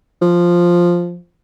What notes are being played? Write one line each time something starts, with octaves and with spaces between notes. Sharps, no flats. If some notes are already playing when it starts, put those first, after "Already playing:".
F3